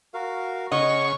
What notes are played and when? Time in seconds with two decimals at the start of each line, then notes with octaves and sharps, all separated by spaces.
0.14 F#4 A#4 F5
0.72 C#3 D#5 F#5 C#6